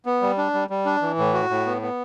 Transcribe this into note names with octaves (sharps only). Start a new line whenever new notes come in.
B3
G3
D4
G3
G3
D4
E3
A2
F#4
A2
B3
B3